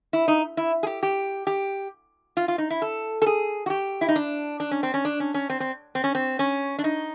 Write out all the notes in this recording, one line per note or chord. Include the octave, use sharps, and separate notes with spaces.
E4
D#4
E4
G#4
G4
G4
G4
F4
F4
D#4
E4
A4
A4
G#4
F#4
G4
E4
D#4
D4
D4
C#4
C4
C#4
D4
C#4
C#4
C4
C4
C4
C#4
C4
C#4
D4
D#4